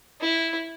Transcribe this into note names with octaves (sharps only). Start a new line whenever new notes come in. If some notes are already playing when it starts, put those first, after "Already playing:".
E4